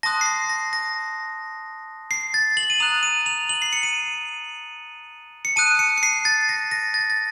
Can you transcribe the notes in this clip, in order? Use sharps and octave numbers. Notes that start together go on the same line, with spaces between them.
A5 C6 D#6 F#6 A#6
C7
A#6
A#6
A#6
C7
A6
F#7
D#7
A#5 D#6 F#6 F7
D#7
F7
F#7
C7
C#7
D#7
C#7
A5 D#6 F#6 D#7
C#7
C#7
C7
A6
A#6
A#6
A6
A6